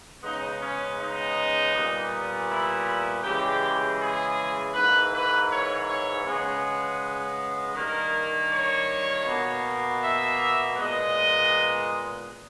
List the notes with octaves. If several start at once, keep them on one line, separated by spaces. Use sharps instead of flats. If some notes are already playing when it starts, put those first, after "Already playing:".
C#3 G#3 B3 D#4
C#4
D#4
A#2 G3 B3
E4
C#3 E3 G#3 G4
G#4
G#2 E3 A#3 B4
B4
C#5
C#5
C#3 G#3 B3 G#4
G2 D#3 A#3 A#4
C#5
B2 A#3
E5
A#2 G#3 B3 D#5